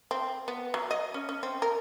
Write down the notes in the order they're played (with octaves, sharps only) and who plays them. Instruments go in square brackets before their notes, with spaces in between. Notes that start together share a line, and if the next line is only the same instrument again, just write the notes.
[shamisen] C4
B3
F#3
D#5
C#4
C#4
C4
A#4